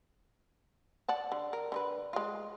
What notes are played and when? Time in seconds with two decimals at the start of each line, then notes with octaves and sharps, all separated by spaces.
1.08 D5 F#5 A5
1.32 D3
1.53 A#4
1.72 D3 D#4 B4
2.13 G#3 F4